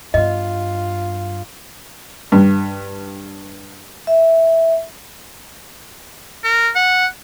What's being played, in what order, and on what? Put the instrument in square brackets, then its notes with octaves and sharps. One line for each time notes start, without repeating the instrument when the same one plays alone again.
[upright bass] G2 B3 [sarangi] F4 [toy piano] D#5
[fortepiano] G2
[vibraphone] E5
[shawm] A#4
F#5